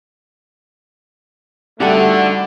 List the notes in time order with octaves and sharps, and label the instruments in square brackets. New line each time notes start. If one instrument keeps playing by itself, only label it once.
[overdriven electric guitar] D3 [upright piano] G3 [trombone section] A3 [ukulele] D#4 F#4 A4